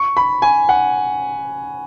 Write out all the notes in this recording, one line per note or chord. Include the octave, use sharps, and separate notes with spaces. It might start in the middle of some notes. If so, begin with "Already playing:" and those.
Already playing: C#6
B5
G#5
F#5